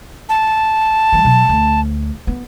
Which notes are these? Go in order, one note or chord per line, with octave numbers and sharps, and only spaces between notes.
A5
E3 G3
B2 F#3
D2
B3